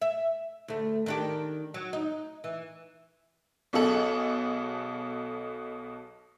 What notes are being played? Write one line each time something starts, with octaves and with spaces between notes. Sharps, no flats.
E5
D2 A3
D#3 D4 G4
F#3
D#4
E3
B1 B2 G#4 A4 F#7